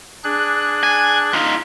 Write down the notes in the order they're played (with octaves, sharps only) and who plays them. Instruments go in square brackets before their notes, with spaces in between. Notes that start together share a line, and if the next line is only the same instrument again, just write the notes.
[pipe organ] D4 G#4 F#6
[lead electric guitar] G#5
D#4 F4